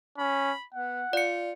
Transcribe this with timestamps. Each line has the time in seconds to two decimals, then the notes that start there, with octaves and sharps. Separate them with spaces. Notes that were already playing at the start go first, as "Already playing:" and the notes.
0.18 C#4 B5
0.74 B3 F#5
1.13 F4 D5 C#7